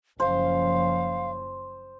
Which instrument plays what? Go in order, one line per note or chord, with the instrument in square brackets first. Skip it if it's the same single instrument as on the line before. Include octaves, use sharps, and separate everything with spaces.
[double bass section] F#1 F3 C#4 [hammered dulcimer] C5 [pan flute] F5